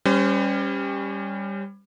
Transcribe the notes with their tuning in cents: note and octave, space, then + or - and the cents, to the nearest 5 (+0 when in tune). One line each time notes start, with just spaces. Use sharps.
G3 +15 C#4 +0 C5 -40